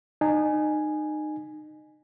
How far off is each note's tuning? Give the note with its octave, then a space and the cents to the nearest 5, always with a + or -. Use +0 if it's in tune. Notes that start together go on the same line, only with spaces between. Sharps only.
D#4 -30 G#5 +0